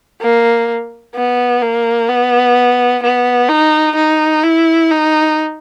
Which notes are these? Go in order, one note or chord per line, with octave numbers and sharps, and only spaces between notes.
A#3
B3
A#3
B3
B3
D#4
D#4
E4
D#4